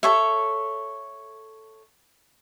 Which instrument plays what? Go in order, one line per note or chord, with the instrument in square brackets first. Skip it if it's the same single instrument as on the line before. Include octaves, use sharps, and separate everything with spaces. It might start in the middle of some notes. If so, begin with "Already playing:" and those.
[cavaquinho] A4 C#5 E5